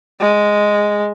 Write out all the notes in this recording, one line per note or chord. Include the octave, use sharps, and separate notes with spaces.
G#3